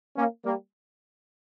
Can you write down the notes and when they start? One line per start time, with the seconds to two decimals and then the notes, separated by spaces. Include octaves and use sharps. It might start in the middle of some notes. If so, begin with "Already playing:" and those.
0.16 A#3 C#4
0.45 G3 A#3